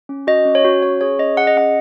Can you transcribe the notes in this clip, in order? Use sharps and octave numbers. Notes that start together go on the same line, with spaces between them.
C#4
F#4 D#5
C#4
C#5
F#4
C#4 C#5
G#4 C#5
C#4 D#5
G#4 F#5
D#5
C#4 F#5